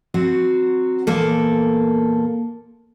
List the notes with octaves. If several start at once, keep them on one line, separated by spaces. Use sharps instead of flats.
F#3 C4 F#4
E2 A#2 A#3 A4